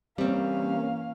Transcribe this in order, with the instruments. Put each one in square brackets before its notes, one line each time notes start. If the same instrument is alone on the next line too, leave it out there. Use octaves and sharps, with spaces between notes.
[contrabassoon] C3 [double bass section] E3 A#3 C#4 [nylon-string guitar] G3 C4 [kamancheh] F5